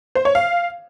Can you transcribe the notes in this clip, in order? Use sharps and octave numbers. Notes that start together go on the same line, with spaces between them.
C5
C#5
F5